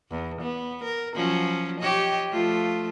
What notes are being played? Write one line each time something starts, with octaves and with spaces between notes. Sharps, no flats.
E2
B3
A#4
F3 F#3 C#4
G4 C#5 D#5
F3 A3 F4